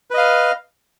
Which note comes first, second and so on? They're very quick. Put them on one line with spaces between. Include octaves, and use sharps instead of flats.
B4 D#5 F5